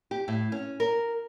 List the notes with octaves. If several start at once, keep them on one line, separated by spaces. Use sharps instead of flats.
G4
A2
C#4
A#4